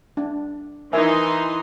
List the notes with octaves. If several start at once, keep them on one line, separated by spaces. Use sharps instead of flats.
D4
E3 D#4 A#4 E5 G#5 C6